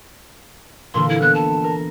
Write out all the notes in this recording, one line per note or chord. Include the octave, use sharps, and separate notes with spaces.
A#2 D3 E3 C6
E4
B3 F#6
A5
A#4